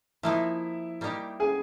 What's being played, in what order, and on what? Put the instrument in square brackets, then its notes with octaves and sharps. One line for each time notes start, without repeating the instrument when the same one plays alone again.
[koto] F3 A#3 D#4 [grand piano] E4 E5
[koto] G3 A#3 D#4 G4
[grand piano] G#4 G#5